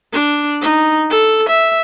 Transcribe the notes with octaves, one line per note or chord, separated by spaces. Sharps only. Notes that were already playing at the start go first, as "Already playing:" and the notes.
D4
D#4
A4
E5